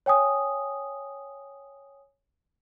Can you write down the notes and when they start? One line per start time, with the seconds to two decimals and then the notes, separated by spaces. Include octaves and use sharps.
0.06 C#5 G5 G#5 D#6